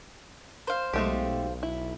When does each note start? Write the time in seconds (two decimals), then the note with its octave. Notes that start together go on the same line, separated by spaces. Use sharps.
0.67 C5 F5
0.93 B1 G#3 A3 G4
1.63 E4